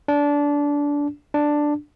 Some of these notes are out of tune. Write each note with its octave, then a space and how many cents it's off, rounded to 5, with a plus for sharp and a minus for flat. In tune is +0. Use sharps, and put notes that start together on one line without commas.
D4 -20
D4 +5